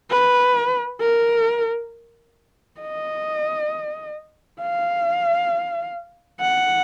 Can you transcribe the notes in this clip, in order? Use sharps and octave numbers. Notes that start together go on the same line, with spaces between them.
B4
A#4
D#5
F5
F#5